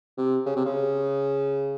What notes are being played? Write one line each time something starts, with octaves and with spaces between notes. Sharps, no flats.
C3
C#3
C3
C#3